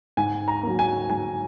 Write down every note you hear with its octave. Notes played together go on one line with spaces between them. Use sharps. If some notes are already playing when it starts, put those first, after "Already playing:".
G#2 G#5
A#5
F#3 A#3
G#5
G#2 G#5